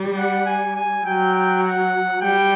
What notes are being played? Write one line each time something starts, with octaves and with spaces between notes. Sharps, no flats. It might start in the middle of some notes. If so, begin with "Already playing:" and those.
Already playing: G3
F#5
G#5
G#5
F#3 G5
G5
F#5
G3 G5